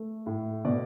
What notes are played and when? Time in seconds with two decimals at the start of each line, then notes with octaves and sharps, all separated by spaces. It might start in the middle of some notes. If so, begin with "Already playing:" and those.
Already playing: A3
0.26 A2
0.65 B2 D5